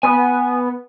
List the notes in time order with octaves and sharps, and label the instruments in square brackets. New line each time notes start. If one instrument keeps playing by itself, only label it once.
[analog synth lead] B3 [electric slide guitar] G#5